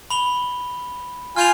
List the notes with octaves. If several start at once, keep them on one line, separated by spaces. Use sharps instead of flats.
B5 F7 G7
F4 G#5 F6 G6 F7